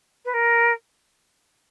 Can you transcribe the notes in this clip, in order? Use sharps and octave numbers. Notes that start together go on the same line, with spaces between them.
B4
A#4